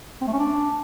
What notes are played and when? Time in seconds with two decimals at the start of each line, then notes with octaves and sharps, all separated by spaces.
0.21 C4
0.27 A3
0.33 C#4
0.39 D4